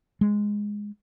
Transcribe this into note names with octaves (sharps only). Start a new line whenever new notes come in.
G#3